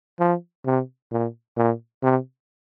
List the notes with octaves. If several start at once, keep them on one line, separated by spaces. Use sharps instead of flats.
F3
C3
A#2
A#2
C3